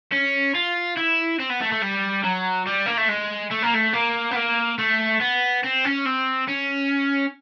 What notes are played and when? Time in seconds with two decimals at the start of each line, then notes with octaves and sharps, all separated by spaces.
0.12 C#4
0.55 F4
0.97 E4
1.39 C4
1.50 B3
1.61 A3
1.71 A3
1.82 G3
2.24 F#3
2.67 G3
2.86 A#3
2.98 A3
3.09 G#3
3.51 A3
3.63 A#3
3.75 A3
3.93 A#3
4.31 B3
4.36 A#3
4.78 A3
5.21 B3
5.63 C4
5.85 C#4
6.05 C4
6.48 C#4